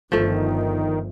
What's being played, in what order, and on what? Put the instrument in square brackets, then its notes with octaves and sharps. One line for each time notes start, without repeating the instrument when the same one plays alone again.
[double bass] G1 [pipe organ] D#3 [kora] F3 A3